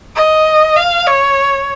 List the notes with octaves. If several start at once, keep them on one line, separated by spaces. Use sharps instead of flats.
D#5
F5
C#5